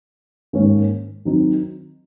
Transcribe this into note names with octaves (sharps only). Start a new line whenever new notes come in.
G#2 D#3 A#3 C#4
D#3 F#3 C4 D#4